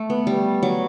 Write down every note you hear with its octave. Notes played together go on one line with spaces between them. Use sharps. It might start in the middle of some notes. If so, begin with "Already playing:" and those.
Already playing: A3
B3
G3
F#3